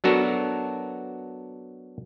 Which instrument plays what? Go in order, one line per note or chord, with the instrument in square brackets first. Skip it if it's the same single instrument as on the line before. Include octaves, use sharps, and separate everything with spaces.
[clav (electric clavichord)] F#3 B3 D4 F#4 A4 A#4